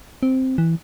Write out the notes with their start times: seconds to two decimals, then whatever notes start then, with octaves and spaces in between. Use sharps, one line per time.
0.23 C4
0.58 E3